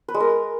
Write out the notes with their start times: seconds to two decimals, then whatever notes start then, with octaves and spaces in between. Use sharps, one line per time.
0.08 B4
0.14 G#3
0.20 A#4